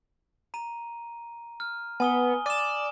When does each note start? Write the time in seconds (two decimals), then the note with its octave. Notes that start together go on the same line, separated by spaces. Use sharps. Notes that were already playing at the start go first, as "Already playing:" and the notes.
0.54 A#5 D#7
1.60 F6
2.00 B3 G#5 D#6 G7
2.46 D5 D#7 E7